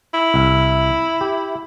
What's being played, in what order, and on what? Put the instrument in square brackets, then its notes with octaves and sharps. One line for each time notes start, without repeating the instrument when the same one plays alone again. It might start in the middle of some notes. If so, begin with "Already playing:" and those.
[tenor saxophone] E4
[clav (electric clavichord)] C2 E5
G4